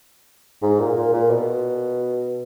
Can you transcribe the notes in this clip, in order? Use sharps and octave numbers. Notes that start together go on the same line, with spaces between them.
G#2
A#2
A#2
A#2
B2